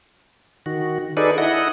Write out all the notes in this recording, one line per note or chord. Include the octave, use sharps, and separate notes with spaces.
D#3 F#4
D#4 G#4 A4 B4 D5
E4 D#5 F#5